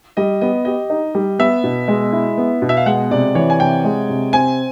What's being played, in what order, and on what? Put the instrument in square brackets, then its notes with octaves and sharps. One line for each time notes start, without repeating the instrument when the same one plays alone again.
[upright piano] G3 [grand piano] D#5
[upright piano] B3 [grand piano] D#5
[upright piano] G4 [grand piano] D#5
[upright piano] D#4
G3
[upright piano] B3 [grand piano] E5
[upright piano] B2
G#3
E4
B3
B2
[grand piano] E5
F5
[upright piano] G#3 [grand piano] F#5
[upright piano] C3 [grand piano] D5
[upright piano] E3 [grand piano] C#5
[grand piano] G#5
[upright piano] C3 [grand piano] G5
[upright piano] G#3
C3
[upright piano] C4 [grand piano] G#5